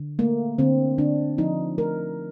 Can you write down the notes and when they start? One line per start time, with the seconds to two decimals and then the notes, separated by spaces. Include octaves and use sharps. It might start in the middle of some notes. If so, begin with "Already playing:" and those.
Already playing: D3
0.19 A3 A#3
0.58 D3 C4
0.98 D3 D4
1.38 F3 D#4
1.78 A3 A#4